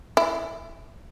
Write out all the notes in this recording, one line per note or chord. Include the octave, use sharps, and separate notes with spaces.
E4